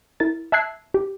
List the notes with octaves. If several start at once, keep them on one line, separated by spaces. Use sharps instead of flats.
E4 A#4 A6
E5 A5 E6 F#6 G#6 C7
G4